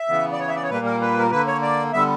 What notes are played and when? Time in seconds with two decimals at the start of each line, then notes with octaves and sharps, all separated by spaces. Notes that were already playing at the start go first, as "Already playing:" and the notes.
Already playing: E5
0.09 C#3 E3 B3
0.32 D5
0.39 C#5
0.48 E5
0.55 D5
0.63 C#5
0.70 A#2 G3 A#3 B4
0.86 A#4
1.01 B4
1.19 A#4
1.31 D3 A#3 B4
1.47 C#5
1.62 D5
1.93 D3 G3 B3 E5